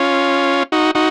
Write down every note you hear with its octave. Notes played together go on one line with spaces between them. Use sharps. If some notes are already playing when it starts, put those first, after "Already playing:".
Already playing: C#4 F4
D#4 F#4
D#4 F#4